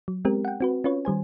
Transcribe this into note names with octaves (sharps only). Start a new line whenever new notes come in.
F#3
G#3 B3 C4 G4 A#4
F#5 G5
C4 F#4 B4
C#4 F4 B4 C#5
D#3 G3 C5 G#5